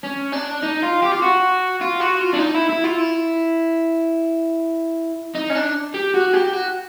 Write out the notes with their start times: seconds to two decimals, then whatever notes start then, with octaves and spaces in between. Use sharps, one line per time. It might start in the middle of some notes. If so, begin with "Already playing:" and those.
0.04 C#4
0.33 D4
0.63 D#4
0.83 F4
1.03 G4
1.12 F4
1.22 F#4
1.81 F4
2.01 F#4
2.21 F4
2.34 D4
2.39 D#4
2.55 E4
2.69 E4
2.84 F4
2.98 E4
5.35 D#4
5.50 C#4
5.55 D4
5.94 G4
6.14 F#4
6.33 G4
6.53 F#4